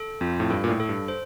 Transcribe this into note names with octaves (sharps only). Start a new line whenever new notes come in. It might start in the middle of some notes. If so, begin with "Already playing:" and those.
Already playing: A4
F2 F4
A2
G2 A4
A#2
A2
A4
G2
C5